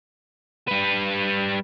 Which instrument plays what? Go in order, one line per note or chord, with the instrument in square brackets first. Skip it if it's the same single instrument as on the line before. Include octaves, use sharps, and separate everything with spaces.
[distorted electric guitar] G3 B4